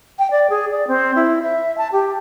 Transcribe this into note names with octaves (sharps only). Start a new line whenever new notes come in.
G5
D5
G#4
D5
C4
E4
E5
A5
G4